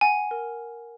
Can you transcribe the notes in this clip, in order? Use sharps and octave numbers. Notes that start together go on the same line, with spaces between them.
F#5 G#5
A#4